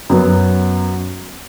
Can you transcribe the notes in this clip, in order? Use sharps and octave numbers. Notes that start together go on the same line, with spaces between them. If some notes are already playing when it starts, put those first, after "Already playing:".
F#2 F#3 B3